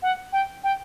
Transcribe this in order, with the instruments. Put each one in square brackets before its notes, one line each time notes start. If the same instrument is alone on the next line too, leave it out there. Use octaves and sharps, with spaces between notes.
[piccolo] F#5
G5
G5